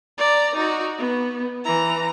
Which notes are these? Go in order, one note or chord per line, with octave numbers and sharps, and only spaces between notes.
D5 A#5
D#4 F#4
B3
E3 A#5